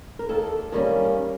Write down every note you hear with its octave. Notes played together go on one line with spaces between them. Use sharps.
A#4
D#2 A4
D#3 G3 A#3 C#4